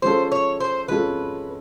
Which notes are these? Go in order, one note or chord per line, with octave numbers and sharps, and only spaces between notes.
F3 G#3 C#4 F4 A4 C5
C#5
C5
F3 G#3 C#4 F4 A4 B4